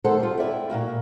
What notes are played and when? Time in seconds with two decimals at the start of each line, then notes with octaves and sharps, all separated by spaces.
0.04 D#3 A3 A4 C5 F#5 A5
0.20 G3 F4
0.38 E4 D5 E5 G5
0.70 A#2 F#3 A#3 F#4